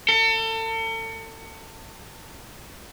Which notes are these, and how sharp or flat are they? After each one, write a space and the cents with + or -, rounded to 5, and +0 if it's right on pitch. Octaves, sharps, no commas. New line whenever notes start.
A4 +35